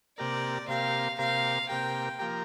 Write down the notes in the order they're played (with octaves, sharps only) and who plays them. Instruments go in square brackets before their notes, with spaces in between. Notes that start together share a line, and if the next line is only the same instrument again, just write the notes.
[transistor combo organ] C3 A#3 G4 A#4 [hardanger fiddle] D5
[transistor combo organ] C3 A#3 G4 A#4 [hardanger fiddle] F5
[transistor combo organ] C3 A#3 G4 A#4 [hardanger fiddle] F5
[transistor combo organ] C3 A#3 G4 A#4 [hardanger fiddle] G5
[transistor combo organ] F3 A#3 G4 A#4